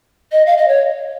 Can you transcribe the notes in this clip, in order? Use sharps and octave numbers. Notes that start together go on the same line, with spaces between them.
D#5
F5
D#5
C#5